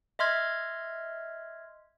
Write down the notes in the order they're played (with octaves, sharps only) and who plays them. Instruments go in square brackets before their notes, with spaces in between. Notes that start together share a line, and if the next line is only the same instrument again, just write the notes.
[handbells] D#5 E5 C6 F6 G#6